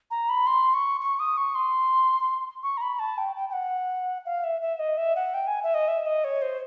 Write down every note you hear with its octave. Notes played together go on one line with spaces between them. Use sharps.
A#5
B5
C6
C#6
C#6
D#6
C#6
C6
C#6
A#5
B5
A5
G5
G5
G5
F#5
F5
E5
E5
D#5
E5
F#5
G5
G#5
E5
D#5
E5
D#5
C#5
C5